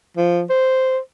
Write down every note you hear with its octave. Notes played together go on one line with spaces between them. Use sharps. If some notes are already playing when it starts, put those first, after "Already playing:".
F3
C5